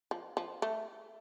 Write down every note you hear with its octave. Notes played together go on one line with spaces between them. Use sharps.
F3
F3
A3